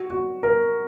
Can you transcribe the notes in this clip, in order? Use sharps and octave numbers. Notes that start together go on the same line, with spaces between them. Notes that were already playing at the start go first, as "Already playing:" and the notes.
Already playing: F#4
F#4
A#4